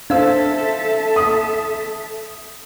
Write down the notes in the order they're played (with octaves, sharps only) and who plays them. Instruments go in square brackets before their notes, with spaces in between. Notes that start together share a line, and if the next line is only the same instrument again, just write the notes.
[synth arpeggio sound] D4 F5 E6 [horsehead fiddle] A4 E5 [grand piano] C5
[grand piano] D#6